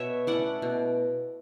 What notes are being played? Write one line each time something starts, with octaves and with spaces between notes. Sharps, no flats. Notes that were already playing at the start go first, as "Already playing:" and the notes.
Already playing: B2 C#5 E5
A3 C#4 E4 D5 F#5
B2